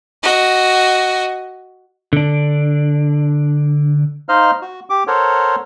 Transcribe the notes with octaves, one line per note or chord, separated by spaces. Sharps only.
F#4 D#5
D3 D4
D#4 C5 D#5 F5 F6
F#4
G4 D6
A4 A#4 C5 C#5 F#5